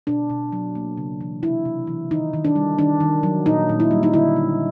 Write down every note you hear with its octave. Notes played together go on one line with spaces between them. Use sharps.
B2 D4
B2
F#3
A#3
C#3
E3
C3 E4
C3
E3
D#3 D#4
D#3
D4
G3
D#3 D4
D#3
F#3
A#2 D#4
A#2
E4
G3
D#4
D3 E4
D3